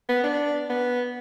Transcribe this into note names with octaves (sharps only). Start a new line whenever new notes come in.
B3
D4
B3